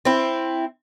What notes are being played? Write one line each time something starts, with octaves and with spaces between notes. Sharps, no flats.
C4 E4